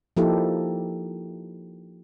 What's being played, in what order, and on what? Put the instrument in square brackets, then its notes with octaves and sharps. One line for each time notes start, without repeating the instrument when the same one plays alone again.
[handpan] F3 A#3 D#4 E4 G4 A4